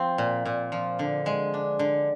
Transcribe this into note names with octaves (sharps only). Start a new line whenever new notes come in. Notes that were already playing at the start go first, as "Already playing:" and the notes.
Already playing: F3 C4
A#2
A#2
F3
D3
G#3
D4
D3